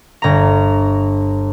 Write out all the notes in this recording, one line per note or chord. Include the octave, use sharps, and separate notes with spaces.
G1 A#5